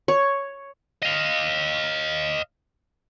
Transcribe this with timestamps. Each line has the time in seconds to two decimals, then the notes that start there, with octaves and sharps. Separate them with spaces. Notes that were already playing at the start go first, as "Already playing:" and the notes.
0.08 C#5
1.02 D#5 F5